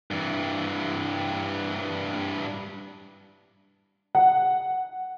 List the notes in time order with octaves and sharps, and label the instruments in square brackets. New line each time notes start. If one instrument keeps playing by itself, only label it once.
[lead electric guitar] G2 E3
[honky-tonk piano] F#5